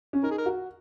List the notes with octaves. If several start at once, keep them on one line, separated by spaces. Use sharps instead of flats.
C#4
D#4 A#4
G#4
A#4
F#4